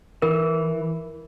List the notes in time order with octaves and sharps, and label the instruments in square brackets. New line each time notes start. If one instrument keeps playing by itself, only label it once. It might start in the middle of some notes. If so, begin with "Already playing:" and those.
[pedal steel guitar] E3 [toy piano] A#4